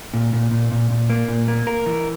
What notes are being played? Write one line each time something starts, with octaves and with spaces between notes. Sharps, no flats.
A#2
A#2
A#2
A#2
A#2
A#3
A#2
A#3
A#4
E3